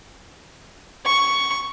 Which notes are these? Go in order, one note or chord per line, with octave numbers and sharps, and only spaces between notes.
C#6